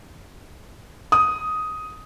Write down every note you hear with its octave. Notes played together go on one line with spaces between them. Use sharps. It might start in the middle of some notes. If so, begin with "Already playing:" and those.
D#6